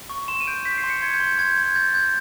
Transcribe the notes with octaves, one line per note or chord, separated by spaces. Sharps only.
C#6
C6 E7
D#7
G6 D7
G6 B6
C7
C6
C#7
C6 G#6
G6
C6
G6
C6 G#6
G6
C6
G#6
G6 A6
G6